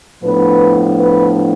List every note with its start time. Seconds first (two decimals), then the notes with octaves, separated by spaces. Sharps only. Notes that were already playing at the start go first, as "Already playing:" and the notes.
0.23 A2 F3 B3 D4 B4
0.99 B4